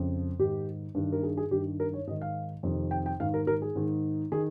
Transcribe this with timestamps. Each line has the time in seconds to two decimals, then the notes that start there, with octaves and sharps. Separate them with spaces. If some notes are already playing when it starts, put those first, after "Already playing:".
Already playing: F2 C#3
0.39 G#2 D#3 G4
0.95 G2 D#3
1.12 A#4
1.23 G#4
1.37 G#4
1.51 G2 D#3 G4
1.80 A#4
1.93 C#5
2.07 G#2 D#5
2.11 D#3
2.22 F5
2.63 F2 C3 D#3
2.91 G5
3.06 G5
3.20 G#2 D#3 F5
3.34 A#4
3.47 A#4
3.62 G#4
3.75 G#2 D#3
4.32 D#3 G#4